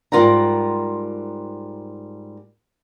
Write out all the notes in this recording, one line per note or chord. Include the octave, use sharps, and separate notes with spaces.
G#2 G3 F4 A#4 F#5 A#5